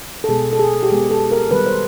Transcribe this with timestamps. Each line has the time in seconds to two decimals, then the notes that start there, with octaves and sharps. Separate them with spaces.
0.24 A4
0.29 B2 G#3 B3 G#4
0.53 A4
0.59 G#4
0.83 G4
0.90 B2 G#3 B3 G#4
1.11 A4
1.31 A#4
1.51 D#3 G3 B3 B4
1.66 C5